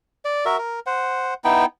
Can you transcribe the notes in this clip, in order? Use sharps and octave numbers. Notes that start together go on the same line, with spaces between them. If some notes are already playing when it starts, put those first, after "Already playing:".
D5
F#4 A#4 E5
A#4
C5 F#5
B3 D#4 E4 G5